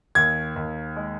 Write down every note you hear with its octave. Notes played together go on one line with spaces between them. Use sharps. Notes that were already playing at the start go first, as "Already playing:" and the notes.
D#2 G#6
D#2
G#3